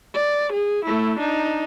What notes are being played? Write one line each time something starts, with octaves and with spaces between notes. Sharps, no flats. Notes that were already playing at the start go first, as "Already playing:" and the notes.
D5
G#4
A3 E4
D4 D#4